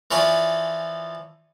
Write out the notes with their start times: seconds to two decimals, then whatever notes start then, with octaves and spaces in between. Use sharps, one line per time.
0.11 E3 F3 C#5 D5 G#5